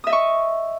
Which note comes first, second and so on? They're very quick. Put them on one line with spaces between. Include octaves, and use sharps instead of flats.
D#6 E5 D#5 C#6